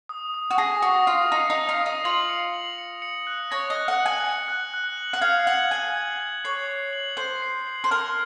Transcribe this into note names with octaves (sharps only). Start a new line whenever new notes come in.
D#6
D#6
F#4
G#4 A#6
F#4 D#6
F4 D#6
D#4 A#6
D#4
A#6
F4
D#6
D#4
F4 F#7
C#7
F#7
C#7
C#7
F#6
C#5 A#6
D#5
F#6
F#5
F#7
G#5
C#7
F#6
F#6
F#7
F#5
F5 G#6
F#5 F#7
G#5 G#6
G#6
G#6
C#5 C7
C7
F#7
C5 F#7
C7
F#7
C5
A#4 F6